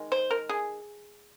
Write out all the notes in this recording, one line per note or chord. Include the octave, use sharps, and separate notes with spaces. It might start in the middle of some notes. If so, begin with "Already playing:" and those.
Already playing: D#3 G#3
C5
A#4
G#4